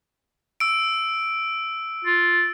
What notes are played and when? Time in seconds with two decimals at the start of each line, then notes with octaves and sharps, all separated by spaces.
0.60 E6 D7
2.05 F4